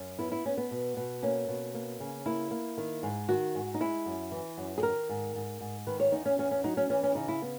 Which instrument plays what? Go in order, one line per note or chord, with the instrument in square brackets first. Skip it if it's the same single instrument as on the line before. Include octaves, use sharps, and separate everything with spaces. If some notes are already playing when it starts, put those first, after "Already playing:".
Already playing: [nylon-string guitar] F#2
B3 E4
E4
B3 C#4
B3
B2
B2
A#3 C#4
B2
A#3
C#3
A#3 E4
A#3
D#3
G#2
D#3 F#4
G#2
D#4
G#3 E4
F#2
E3
F#2
G#4
D#3 A#4
G#2
G#2
G#2
D#3 B4
C#5
E2 D#4
C#4
E2 C#4
C#4
F#3 D#4
C#4
E3 C#4
C#4
C#3 D#4
E4
B3